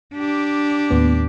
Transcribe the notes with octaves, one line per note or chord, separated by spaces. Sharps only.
D4 G4
D#2 A2 B3